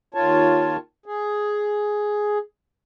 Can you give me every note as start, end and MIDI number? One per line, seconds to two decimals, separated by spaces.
0.14 0.77 39
0.14 0.77 65
0.14 0.77 73
0.14 0.77 81
1.06 2.38 68